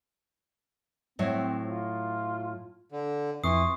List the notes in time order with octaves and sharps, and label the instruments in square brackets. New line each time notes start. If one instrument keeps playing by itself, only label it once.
[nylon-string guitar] A2 F#3 E5 [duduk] C4
[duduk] F4
[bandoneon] D3
[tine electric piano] F2 [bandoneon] E3 [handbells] C6 C#6 C7 [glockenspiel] D#6